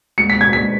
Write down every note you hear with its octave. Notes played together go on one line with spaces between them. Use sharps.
G#3 C#7
B6
B2
G#6
G#3 B6